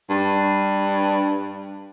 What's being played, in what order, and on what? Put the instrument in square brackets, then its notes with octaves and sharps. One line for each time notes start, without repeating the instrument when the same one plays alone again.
[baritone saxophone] G2